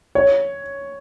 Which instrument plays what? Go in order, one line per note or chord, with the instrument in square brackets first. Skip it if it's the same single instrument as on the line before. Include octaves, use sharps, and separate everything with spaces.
[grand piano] C#5